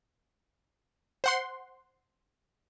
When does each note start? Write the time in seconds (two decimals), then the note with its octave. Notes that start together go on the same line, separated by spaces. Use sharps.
1.24 C5 F#5 C6